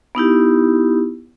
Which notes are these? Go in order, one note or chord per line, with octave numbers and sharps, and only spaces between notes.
B3 D#4 E4 G4